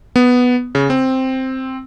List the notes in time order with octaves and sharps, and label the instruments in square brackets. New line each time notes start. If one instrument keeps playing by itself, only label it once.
[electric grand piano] B3
C#3
C4